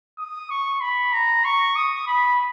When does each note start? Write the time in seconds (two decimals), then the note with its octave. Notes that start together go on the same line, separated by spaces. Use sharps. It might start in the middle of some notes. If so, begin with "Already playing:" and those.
0.19 D#6
0.50 C#6
0.81 B5
1.12 A#5
1.45 C#6
1.76 D#6
2.07 B5